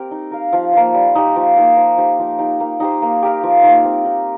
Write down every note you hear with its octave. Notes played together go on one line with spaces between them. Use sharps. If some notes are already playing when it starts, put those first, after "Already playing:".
Already playing: C4 G4 A#4
D#4
A#4 F5
F3
A#3 F4 C5
G3
D#4 G4
F3
A#3 D#4 A#4
F3
D#4 G4 C5
F3
D#4 G4
A#3
D#4 G4 C5
A#3
G4 A#4 F5
F3
A#3 D#4
C4
D#4 A#4